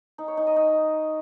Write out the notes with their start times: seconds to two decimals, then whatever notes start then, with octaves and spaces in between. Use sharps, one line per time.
0.18 D#4
0.28 C#5
0.37 D#4
0.47 D#5
0.56 D#4